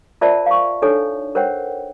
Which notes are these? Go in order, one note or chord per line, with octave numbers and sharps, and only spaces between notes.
F4 A#4 C5 D5 E5 A5
F5 C#6
D4 D#4 A4 C#5
A#4 C5 C#5 F#5 G5